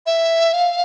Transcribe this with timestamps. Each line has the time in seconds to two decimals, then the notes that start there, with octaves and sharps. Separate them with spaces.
0.06 E5
0.53 F5